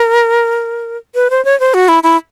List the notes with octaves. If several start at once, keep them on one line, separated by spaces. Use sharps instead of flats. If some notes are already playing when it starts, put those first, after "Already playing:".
Already playing: A#4
B4
C5
C#5
C5
F#4
E4
E4